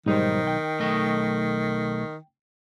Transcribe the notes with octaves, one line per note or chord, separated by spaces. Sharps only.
B1 G#2 D#3 G3 D#4 C5
G5
B1 A3 D#5